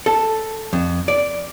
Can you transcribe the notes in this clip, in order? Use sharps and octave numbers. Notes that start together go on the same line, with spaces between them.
A4
F2
D5